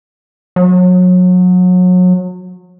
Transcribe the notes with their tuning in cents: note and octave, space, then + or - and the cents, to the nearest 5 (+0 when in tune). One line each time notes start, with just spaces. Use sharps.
F#3 -30